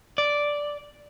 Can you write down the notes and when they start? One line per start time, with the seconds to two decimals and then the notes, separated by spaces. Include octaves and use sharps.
0.18 D5